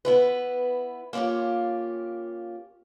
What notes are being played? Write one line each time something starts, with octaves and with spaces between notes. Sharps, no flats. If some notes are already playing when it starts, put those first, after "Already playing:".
B3 E4 B4
A#3 B3 C#4 F4 G4